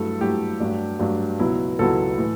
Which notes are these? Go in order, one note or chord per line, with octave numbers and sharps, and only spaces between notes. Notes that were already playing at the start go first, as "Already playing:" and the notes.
Already playing: G2 F#3 A3 E4 A4
G2 F#3 A3 E4 G4
G2 F#3 A3 D4
G2 F#3 A3 D4
C#2 B2 F#3 B3 E4
C#2 B2 F#3 B3 E4 A4
A2 E3